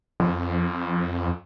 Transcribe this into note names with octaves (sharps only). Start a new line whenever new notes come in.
F2